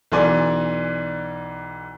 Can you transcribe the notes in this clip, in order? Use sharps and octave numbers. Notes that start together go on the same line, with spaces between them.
B1 E3 D5 G#5 C6